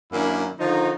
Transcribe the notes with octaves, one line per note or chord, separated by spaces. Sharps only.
F#2 D#3 A#3 D4 E4
D3 D#3 F3 D#4